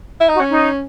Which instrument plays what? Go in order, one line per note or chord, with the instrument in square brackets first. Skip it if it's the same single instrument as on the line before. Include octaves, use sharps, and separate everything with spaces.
[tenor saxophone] E4
D#4
[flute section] F#4
[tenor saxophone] C#4
[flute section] D#4